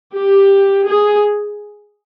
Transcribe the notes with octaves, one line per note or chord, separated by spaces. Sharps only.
G4
G#4